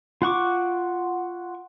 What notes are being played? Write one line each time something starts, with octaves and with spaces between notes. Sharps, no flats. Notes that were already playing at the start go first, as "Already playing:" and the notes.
F4 F#5 C#6 D6